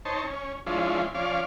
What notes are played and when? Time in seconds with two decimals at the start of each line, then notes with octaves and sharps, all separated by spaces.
0.05 D#4 C5 C#5 A5
0.24 C#4
0.66 F3 G#3 C#4 D4 E4 F4
1.15 F3 C#4 D5 F5